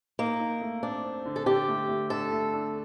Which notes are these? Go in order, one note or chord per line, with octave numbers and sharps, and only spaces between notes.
A#3 D#4
D#4
A3
C4 D4
C4
D3
A4
D3 G4
A3
A3
D3 A4
A3
D4